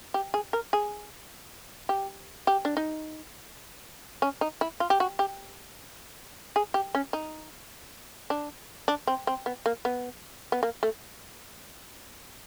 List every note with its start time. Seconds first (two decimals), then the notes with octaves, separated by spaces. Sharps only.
0.14 G4
0.34 G#4
0.53 A#4
0.73 G#4
1.89 G4
2.47 G4
2.65 D4
2.77 D#4
4.22 C#4
4.41 D#4
4.61 E4
4.80 F4
4.90 G4
5.00 F#4
5.19 G4
6.56 G#4
6.74 G4
6.95 C#4
7.13 D#4
8.30 D4
8.88 D4
9.07 C4
9.27 C4
9.46 B3
9.66 A#3
9.85 B3
10.52 B3
10.63 A#3
10.83 A3